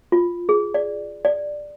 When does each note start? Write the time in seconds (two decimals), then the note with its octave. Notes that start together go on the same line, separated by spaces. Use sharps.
0.12 F4
0.49 G#4
0.74 D5
1.25 D5